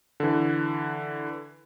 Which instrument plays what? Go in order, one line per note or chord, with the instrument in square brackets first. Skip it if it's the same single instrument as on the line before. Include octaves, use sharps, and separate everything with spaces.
[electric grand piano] D3 E3